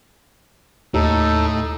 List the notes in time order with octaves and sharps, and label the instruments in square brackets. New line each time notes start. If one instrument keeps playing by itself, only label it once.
[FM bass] D#2 [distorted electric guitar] A2 [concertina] D#4 A4